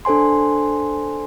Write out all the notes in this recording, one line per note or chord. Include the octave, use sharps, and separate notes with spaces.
D4 A4 C5 G#5 C6